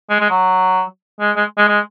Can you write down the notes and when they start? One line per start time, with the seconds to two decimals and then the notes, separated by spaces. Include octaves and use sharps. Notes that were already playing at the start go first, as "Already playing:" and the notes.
0.10 G#3
0.20 G#3
0.30 F#3
1.20 G#3
1.36 G#3
1.58 G#3
1.68 G#3